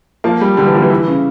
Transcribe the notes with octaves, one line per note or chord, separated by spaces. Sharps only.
F3 A#3
G3
D3 G3
E3
F3 A#3
E3
E4
C#3